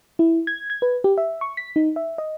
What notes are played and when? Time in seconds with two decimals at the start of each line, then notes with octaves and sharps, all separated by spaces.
0.19 E4
0.47 G#6
0.70 G#6
0.82 B4
1.04 G4
1.18 E5
1.41 C#6
1.57 B6
1.76 D#4
1.96 E5
2.18 D#5